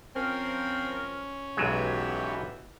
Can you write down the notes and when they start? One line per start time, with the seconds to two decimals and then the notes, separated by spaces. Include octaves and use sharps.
0.16 F3 C4 C#4 A#4
1.57 B1 B2 E3 F#3 G#3 B3 G4